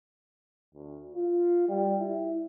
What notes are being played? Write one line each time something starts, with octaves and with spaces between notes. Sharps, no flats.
D2
F4
G3
E4